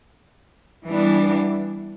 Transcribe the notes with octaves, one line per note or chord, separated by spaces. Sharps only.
E3 G3 B3 D4